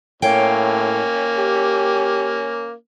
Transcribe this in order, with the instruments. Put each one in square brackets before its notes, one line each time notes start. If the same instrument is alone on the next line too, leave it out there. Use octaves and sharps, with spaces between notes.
[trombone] A2 [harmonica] A#3 C#4 [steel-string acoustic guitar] C#5 F5 G5
[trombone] G4